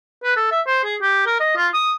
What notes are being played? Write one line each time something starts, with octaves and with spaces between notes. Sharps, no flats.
B4
A4
E5
C5
G#4
G4
A#4
D#5
F4
D#6